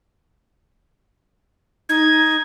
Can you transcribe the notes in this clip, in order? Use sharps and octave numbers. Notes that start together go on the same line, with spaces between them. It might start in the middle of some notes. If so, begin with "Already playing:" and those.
D#4 G#6